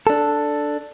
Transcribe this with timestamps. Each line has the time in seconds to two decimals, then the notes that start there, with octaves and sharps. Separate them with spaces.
0.07 D4 A4